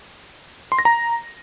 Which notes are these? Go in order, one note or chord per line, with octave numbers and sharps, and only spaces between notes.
C6
A#6
A#5